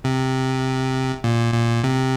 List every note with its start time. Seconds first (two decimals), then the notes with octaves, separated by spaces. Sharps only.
0.04 C3
1.24 A#2
1.54 A#2
1.84 C3